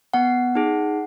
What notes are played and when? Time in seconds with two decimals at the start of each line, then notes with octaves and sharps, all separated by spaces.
0.14 B3 F#5
0.55 D#4 G#4